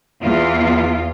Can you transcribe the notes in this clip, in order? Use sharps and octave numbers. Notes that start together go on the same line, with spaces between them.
E2 F4